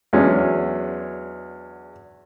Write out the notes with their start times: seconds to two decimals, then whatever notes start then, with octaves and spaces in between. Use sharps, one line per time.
0.13 E2 F#3 G#3 C#4 D4